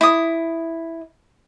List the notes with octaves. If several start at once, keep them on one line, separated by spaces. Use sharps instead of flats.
E4 D#6